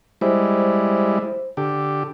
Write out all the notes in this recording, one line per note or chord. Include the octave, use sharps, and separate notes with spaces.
G3 G#3 E4 C5
D3 G4